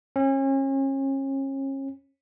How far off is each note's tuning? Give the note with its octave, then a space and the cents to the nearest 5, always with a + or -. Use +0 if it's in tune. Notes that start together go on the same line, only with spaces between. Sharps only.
C#4 -35